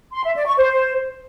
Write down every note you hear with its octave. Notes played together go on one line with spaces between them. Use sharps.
C6
E5
D5
C#6
C5